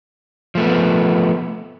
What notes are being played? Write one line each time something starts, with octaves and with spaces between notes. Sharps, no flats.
F3 A3 B3